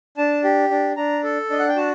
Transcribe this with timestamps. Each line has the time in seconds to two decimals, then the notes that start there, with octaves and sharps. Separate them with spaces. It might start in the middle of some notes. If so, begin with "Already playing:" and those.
0.17 D4 A5
0.44 G4
0.71 D4
0.97 D4 A#5
1.24 A4
1.50 D4 D#5
1.59 F#5
1.68 G5
1.76 F#4 A5